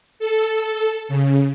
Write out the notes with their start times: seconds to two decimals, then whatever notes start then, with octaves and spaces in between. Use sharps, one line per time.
0.19 A4
1.09 C#3